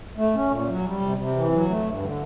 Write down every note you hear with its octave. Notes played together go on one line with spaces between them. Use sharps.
A3
C#4
A#2
F#3
G3
C3
C3
E3
F#3
A3
G2
D3